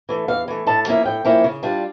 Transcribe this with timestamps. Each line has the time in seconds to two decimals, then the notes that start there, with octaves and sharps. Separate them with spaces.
0.09 E3 A3
0.28 E2 F5
0.48 E3 A3
0.67 A2 A5
0.86 F3 A#3 C#4 E4
1.05 A2 G5
1.25 F3 A#3 C#4 E4
1.44 C#3
1.63 G3 D4 F4